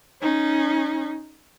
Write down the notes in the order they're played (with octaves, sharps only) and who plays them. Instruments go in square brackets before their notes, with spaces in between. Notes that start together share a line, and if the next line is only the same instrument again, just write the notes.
[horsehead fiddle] C#4 D#4